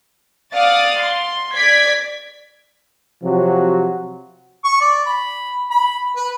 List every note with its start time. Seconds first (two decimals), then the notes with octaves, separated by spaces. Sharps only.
0.54 D5 F5 F#5 D#6 A6
1.02 C6
1.56 D5 G#6 B6
3.22 C3 F3 F#3 F#4
4.64 C#6
4.81 D5
5.07 B5
5.71 B5
6.16 B4